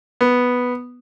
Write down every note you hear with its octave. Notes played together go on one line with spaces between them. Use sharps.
B3